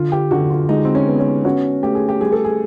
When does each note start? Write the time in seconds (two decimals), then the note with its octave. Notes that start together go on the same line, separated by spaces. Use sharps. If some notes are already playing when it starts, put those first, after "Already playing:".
Already playing: D3 F4
0.12 G4
0.31 D3 F#4
0.50 F4
0.69 G#3 D#4
0.85 C4
0.95 C#4
1.07 B3
1.19 C#4
1.45 C#4 F#4
1.83 A3 G4
1.95 G#4
2.09 G4
2.21 G3 G#4
2.32 A4
2.45 G#4